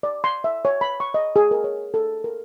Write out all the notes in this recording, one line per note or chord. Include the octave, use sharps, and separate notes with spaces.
D5
C6
E5
C#5
B5
C#6
D#5
G#4
A#4
C#5
A4
A#4